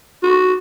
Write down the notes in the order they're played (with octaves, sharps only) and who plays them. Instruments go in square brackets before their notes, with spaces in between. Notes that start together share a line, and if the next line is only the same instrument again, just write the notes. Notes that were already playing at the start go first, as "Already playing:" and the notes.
[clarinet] F#4